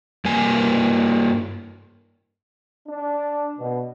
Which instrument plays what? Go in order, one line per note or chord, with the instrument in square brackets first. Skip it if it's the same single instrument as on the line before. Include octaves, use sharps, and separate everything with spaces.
[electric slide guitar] G2 A#3 G#5
[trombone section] D4
B2